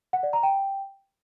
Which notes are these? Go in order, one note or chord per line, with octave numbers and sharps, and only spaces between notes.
F#5
D5
A#5
G5